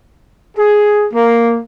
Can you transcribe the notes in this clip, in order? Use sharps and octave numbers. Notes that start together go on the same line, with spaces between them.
G#4
A#3